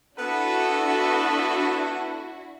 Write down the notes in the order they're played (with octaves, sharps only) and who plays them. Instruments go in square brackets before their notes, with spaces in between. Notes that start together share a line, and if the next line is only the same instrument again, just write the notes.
[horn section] B3 B4 [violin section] D4 E4 F#4 [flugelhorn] A4